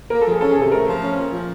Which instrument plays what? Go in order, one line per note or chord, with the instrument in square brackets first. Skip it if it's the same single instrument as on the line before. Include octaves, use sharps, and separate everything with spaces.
[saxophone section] A#3 [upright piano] A#4
[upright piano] A4
[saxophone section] F3
[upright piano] G#4
[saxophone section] C#4 [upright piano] A4
[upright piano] G#4
[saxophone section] C3 [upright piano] A4
[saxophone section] A3 [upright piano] A#4
[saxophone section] F3
C#4
A#2
F3